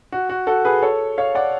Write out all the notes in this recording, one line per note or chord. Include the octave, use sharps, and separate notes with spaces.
F#4
F#4
F#4 A4
G#4 B4
A4 C#5
C#5 F5
D5 F#5